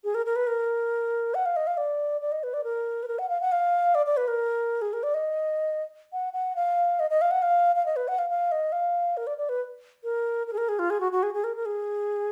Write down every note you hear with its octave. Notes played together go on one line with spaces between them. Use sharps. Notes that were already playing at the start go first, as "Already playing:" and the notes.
G#4
A#4
A#4
B4
A#4
F#5
F5
D#5
F5
D5
D5
D#5
B4
D5
A#4
B4
A#4
F#5
F5
F#5
F5
D5
D5
B4
A#4
G#4
A#4
D5
D#5
F#5
F#5
F5
D#5
D#5
F5
F#5
F5
F5
D#5
B4
F#5
F5
F5
D#5
F5
A#4
D5
D5
B4
A#4
A#4
G#4
A#4
G#4
F4
G#4
F#4
F#4
G#4
G#4
A#4
A#4
G#4